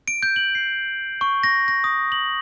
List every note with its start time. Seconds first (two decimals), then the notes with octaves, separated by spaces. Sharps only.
0.08 D7
0.23 G6
0.36 F#7
0.55 C7
1.21 C#6
1.43 A#6
1.68 A#6
1.84 D#6
2.12 F#7